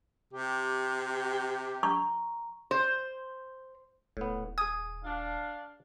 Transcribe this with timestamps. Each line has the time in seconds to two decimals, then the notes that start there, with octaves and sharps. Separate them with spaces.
0.33 C3 G4
1.83 A#5 C#6
2.71 C5
4.17 D#1 A2 B3
4.58 G#4 G#5 D#6
5.04 D4 F5